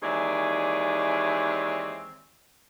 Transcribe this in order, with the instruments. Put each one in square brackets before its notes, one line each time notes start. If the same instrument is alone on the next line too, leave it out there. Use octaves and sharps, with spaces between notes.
[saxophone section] D#2 E3 G#3 C4 C#5 D5